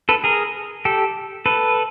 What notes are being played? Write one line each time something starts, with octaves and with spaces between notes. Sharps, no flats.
A4 B4
G#4 A#4
G4 A4
A4 B4